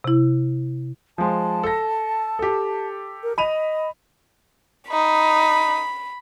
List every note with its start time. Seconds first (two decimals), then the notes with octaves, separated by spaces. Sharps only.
0.04 C3 E4
1.18 F3 G#3 A5
1.63 A4 A#6
2.39 G4 A4
3.23 A#4
3.38 D#5 B5 D#7 F7
4.92 D#4 B5